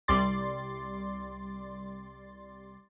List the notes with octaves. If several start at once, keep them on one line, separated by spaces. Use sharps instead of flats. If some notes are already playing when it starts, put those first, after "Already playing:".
C2 G3 D5 C6 A6